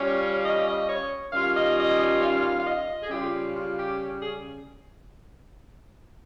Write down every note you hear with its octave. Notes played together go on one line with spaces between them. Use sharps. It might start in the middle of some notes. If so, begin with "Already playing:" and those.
Already playing: G3 C#4 F4 C#5
D#5
D#5
C#5
D#3 G3 C#4 F4 F5
D#5
D#5
D#5
F5
F5
D#5
G#4
C#3 G3 C#4 F4 G4
F4
G4
G#4